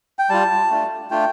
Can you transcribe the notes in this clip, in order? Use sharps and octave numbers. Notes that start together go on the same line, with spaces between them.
G5
G3 F4 A5
A3 D4 F4
A3 D4 F4 G5